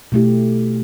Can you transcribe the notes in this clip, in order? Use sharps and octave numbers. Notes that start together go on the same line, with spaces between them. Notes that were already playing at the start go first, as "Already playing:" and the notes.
B2 A3 E4 G4